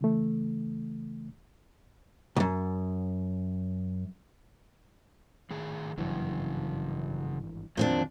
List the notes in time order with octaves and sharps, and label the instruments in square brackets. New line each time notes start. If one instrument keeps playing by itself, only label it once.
[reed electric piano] C#3 E3 A3
[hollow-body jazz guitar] B1 F#2
[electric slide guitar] A2 D#3 G#4
[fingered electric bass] G#1 G2 E3 [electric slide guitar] C#3 F#3
[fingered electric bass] F2 [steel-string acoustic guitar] A#2 C4 D4 [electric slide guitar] D#3 F#3 F4